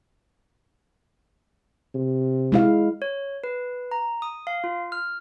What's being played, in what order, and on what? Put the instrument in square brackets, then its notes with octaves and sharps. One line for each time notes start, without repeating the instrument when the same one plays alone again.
[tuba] C3
[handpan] G#3 E4 F5
[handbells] C#5
B4
A#5
D#6
F5
F4
F6